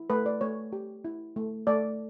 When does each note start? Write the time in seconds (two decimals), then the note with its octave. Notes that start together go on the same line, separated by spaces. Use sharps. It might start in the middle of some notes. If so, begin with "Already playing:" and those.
Already playing: E4
0.10 A3 B4
0.26 D5
0.41 A3 C#5
0.73 G4
1.05 E4
1.36 A3
1.67 A3 D5